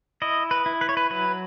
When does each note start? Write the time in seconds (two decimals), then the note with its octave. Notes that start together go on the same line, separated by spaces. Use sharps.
0.22 E4 D#5
0.51 B4
0.66 E4
0.81 B4
0.89 C#5
0.97 B4
1.11 F#3 B4